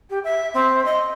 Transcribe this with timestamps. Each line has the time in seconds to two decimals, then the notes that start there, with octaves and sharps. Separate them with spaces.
0.10 G4
0.24 E5
0.54 C4
0.85 D#5